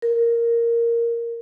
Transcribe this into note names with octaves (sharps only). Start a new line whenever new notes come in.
A#4